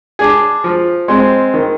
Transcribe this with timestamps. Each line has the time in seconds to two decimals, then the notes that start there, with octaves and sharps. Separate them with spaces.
0.19 D4 G#4
0.64 F3
1.08 G#3 C4
1.54 D#3